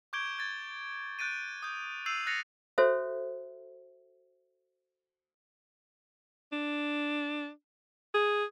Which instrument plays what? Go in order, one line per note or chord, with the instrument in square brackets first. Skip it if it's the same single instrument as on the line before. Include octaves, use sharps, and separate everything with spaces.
[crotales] C#6 D6 G6 G#6 D7 G7
G#6 A6
F#6 G6 A6 D7 D#7
D#6 G6
E6 G6 C7 D#7 F7 F#7
F#6 A6 A#6 C7 C#7 F7
[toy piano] F#4 A4 C5 C#5 E5
[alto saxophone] D4
G#4